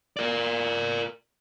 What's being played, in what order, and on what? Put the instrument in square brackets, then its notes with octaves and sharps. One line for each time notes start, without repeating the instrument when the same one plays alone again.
[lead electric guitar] A#4 D5